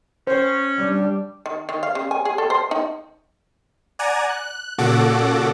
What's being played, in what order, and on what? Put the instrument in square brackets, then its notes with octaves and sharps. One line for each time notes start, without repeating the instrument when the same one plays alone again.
[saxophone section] C#4 [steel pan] C5
[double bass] G3 D4
[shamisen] D#3
D#3
F5
C#3
G#5
G#4
A4
C5
D#4
[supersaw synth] D5 F#5 G#5 A#5
F#6
A#2 C#3 F#4 A4 F#5 D6